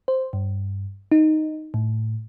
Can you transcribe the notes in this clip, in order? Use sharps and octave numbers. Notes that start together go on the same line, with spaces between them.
C5
G2
D#4
A2